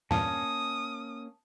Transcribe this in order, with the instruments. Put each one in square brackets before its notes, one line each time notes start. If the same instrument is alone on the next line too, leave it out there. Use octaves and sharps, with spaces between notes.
[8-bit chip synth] E2 G2 A#2 [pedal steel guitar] A#3 C#4 G#5 [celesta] A5 [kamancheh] D#6